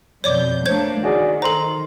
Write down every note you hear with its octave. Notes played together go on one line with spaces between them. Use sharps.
F2 B2 C#5 D5 D6 G6
A3 A#3 D4 C5 C#5 G6 G#6
D#3 F#4 G#4 D5
A4 C5 A#5 C6